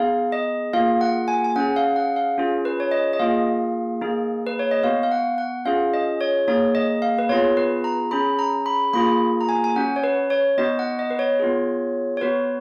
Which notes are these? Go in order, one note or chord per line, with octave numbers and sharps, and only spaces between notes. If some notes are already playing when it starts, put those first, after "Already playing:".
Already playing: B3 D#4 G#4 F5
D#5
A#3 F4 G#4 F5
F#5
G#5
G#5
C#4 G#4 F#5
F5
F#5
F5
C#4 F4 G#4
B4
C#5
D#5
D#5
A#3 F4 G#4 F5
A#3 D#4 G#4
B4
C#5
D#5
B3 F#4 F5
F5
F#5
F#5
C#4 F4 G#4 F5
D#5
C#5
A#3 D#4 G#4 C#5
D#5
F5
B4
B3 F4 G#4 C#5
B4
A#5
C#4 G#4 B5
A#5
B5
A#3 F4 G#4 B5
A#5
G#5
G#5
C#4 F#4 F#5
C#5
B4
C#5
B3 D#4 F#4 D#5
F#5
D#5
B4
C#5
B3 F4 G#4
C#5
B3 F#4 B4